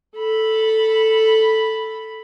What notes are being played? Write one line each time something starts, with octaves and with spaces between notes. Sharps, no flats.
A4 B5